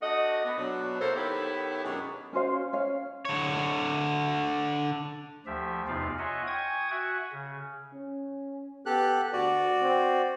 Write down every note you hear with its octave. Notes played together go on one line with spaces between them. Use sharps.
A3 D4 F#4 D#5
B3
B2 F#3 D4
A#3 E4 A4 C5
D#3 B3 E4 G4 A4 C#5
F#2 B2 F#3 G#3 D4 G#4
C#4 F#4 C5 F5
C#4 F5
D3 C#5
D2 F3 G4 E5
E2 C3 D#4 F4 D5 F5
F4 C#5 D#5 E5 F#5 G#5
G5 G#5 C#6 D#6 G#6
F#4 E5 F#5 G#5 C#6
C#3
C#4
B3 G4 A4 F#6
D2 F#4 D5
C4